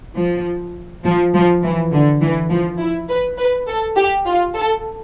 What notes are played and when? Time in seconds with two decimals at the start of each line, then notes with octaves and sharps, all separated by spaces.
0.17 F3
1.04 F3
1.34 F3
1.63 E3
1.93 D3
2.21 E3
2.50 F3
2.80 E4
3.09 B4
3.38 B4
3.67 A4
3.97 G4
4.26 F4
4.55 A4